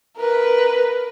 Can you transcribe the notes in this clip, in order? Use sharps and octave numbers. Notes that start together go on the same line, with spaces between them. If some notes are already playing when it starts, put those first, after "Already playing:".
A#4 B4